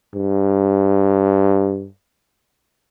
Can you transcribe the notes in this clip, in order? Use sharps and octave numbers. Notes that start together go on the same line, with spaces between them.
G2